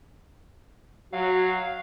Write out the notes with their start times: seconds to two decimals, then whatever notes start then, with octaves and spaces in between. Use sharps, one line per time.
1.13 F#3 F#4 F5